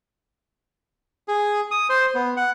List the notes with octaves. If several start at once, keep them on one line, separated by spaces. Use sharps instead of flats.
G#4
D#6
C5
B3
F#5